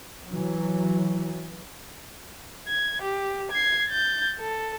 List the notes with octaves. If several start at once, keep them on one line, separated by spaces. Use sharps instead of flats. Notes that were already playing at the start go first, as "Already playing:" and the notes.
E3 F#3
G#6
G4
G#6 C7
G6 A6
A4